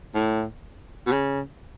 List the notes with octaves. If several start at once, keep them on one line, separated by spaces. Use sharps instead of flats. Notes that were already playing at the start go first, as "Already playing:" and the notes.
A2
B2
C#3